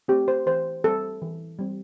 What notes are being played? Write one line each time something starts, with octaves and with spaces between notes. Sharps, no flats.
A3 C4 G4
C5
E3 C5
G3 C4 A4
E3
G3 C4